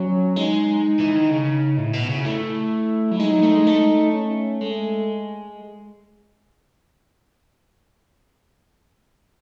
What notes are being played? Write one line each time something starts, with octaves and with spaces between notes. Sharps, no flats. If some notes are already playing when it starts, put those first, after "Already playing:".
Already playing: F#3 C#4
G#3 D#4
E3
D#3
C#3 D#4
A2 E4
B2
C#3
A3 E4
F#3
G#3 D#4
F#3
A3
G#3
A3
C#4
G#3 A3